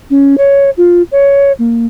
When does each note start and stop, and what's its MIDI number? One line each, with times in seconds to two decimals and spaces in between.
0.10 0.36 61
0.38 0.70 73
0.77 1.02 65
1.12 1.52 73
1.59 1.86 58